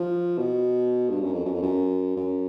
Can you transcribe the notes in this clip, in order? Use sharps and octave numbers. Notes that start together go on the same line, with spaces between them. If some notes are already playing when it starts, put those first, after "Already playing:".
Already playing: F3
B2
G2
F#2
F2
F#2
F2
F#2
F#2